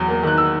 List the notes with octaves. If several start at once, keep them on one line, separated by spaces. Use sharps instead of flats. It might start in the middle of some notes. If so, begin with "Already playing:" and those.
Already playing: E2 F#3
A#3
D#3 F#6
E6